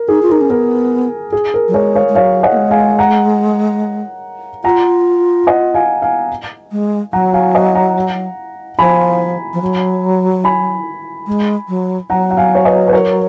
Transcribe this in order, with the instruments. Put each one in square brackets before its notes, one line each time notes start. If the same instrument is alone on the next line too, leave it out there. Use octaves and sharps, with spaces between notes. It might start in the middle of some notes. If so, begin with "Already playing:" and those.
Already playing: [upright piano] A#4
[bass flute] D#4 [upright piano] G#4
[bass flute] F4
[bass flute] D#4 [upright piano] A#4
[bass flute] C#4
[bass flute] B3 [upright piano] A#4
[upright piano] G#4
A#4
[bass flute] F#3
[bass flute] G#3 [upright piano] A#4 C#5
[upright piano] C#5 F5
[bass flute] G#3
[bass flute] F#3 [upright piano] C#5 F5
[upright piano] D#5 F#5
[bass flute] A#3
G#3
[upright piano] F5 G#5
F#5 A#5
[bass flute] F4 [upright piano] F#5 A#5
[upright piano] D#5 F#5
F5 G#5
F5 G#5
[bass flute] G#3
[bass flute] F#3 [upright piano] F#5 A#5
[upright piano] F5 G#5
D#5 F#5
F#5 A#5
[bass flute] F3 [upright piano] G#5 B5
[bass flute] F3
F#3
[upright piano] G#5 B5
[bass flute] G#3
F#3
[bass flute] F#3 [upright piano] F#5 A#5
[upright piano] F#5
F5 G#5
C#5
B4 D#5
B4
A#4 C#5